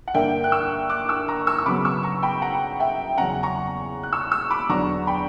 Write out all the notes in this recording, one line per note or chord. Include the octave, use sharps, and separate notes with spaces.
F#5
G2 D3 A#3 D4 E5 G5
F#6
C#6 E6
D6 F#6
C#6 E6
A#5 C#6
C#6 E6
E6
C#3 F#3 B3 B5 D6
C#6 E6
A#5 C#6
G5 B5
F#5 A#5
E5 G5
E2 C#3 F#3 C#4 F#5 A#5
A#5 C#6
F#6
C#6 E6
C#6 E6
B5 D6
E2 D3 F#3 B3 D4 A#5 C#6
G5 B5